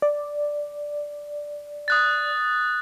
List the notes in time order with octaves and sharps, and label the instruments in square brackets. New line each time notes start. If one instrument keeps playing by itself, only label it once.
[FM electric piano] D5
[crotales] D#6 F#6 A6